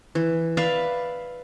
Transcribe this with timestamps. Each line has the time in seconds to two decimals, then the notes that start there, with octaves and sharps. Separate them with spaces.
0.15 E3
0.57 B4 D5 E5 F5